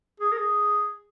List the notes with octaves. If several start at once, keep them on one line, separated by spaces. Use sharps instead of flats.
G#4
A#4
G#4